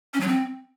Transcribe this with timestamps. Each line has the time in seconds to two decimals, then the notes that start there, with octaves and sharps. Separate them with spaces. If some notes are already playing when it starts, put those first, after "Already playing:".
0.14 C#4
0.21 F#3
0.27 C4